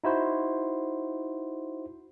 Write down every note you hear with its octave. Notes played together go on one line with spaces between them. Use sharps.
D#4 E4 F#4 C5